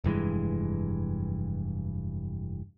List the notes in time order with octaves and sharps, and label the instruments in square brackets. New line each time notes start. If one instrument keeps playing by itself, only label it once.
[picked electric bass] F1 G2 E3 G#3